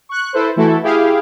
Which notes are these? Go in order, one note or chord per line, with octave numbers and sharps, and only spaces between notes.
C#6 F#6
E4 A4 B4 C5
E3 A3 E4 F#4 A4
E4 G4 G#4 F5